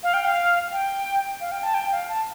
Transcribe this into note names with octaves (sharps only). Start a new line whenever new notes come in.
F5
G5
F5
G5
F5
G5
A5
G5
F5
A5